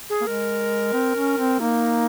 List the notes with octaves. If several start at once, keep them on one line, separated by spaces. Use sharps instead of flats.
G#4
A#3
G#3 A#4
C4
C#4
C4
A#3 D#4